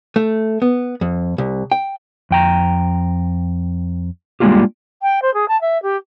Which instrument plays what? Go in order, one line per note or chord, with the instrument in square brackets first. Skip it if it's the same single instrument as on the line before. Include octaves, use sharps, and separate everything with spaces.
[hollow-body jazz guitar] A3
B3
F2
C2
G5
[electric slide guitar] F2 G5 A#5
G3 G#3 A#3 D4 F4 G4
[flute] G5
C5
G#4
A5
E5
G4